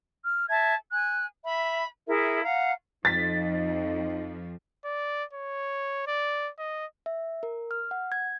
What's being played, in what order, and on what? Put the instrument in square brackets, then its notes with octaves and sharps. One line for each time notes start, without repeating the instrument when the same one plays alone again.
[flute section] F6
E5 A5 G#6
G#5 F#6
E5 B5
E4 G#4 A#4 E5
F5 F#5 A#5
[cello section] F2 F3 [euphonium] D#4 [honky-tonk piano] A6 B6
[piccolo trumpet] D5
C#5
D5
D#5
[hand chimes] E5
A#4
F6
F#5
G#6